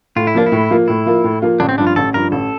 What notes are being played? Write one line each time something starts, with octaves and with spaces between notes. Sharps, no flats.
A2 F4
E4
F3 A#3 D4 F4
E4
A2
F3 A#3 F4
A2 E4
F3 A#3 F4
A2
F3 A#3 F4
A1 D4
C4
G2 F3 D4
F4
A1 A4
G2 F3 A#4
A1 A4